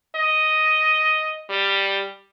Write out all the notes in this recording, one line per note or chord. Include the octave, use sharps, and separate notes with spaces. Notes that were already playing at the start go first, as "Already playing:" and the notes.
D#5
G3